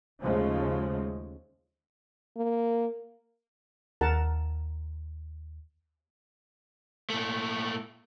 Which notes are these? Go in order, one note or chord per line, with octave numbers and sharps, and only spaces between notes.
D#2 C#3 F3 G#3 A3
A#3
D#2 A#4 F#5 A5
A#2 A3